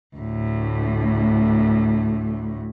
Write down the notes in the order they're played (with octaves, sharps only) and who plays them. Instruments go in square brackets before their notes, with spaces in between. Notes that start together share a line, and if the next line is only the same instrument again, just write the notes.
[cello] D2 A2